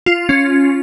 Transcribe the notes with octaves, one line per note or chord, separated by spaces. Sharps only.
F4
C#4